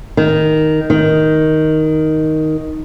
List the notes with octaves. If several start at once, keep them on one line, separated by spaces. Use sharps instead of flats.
D#3
D#3